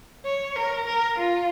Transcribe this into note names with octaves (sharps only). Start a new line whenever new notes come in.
C#5
A#4
A#4
F4